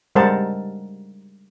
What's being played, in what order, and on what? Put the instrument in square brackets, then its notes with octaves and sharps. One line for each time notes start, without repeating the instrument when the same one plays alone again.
[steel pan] G3 G#3 A#4 C5 F#5 A5